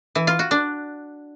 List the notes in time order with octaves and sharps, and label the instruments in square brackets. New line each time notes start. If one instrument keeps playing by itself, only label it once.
[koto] E3
F4
F#4
D4